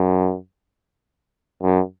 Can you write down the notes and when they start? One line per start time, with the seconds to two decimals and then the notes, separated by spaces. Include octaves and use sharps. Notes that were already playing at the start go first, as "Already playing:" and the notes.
Already playing: F#2
1.62 F#2